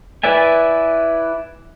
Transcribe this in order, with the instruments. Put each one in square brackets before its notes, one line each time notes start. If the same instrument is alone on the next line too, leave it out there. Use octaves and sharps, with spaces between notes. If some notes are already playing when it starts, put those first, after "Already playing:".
[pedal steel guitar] E4 B4 D5 E5 G#5